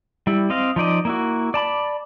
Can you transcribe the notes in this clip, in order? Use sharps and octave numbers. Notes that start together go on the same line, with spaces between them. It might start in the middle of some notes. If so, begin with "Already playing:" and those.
G3 E4
C4 D#5 F5
F3 D#4 D5 D#5
A#3 E4 F#4
D5 A5 B5